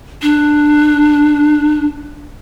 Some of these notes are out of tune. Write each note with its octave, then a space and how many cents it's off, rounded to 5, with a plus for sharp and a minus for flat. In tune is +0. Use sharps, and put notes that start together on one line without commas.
D4 +15